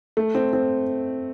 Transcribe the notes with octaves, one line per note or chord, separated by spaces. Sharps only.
A3
C4
C4